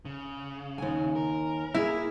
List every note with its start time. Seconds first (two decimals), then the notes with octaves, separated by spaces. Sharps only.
0.05 C#3
0.78 D#2 G#5
1.16 A#4
1.74 A#3 E4 G#4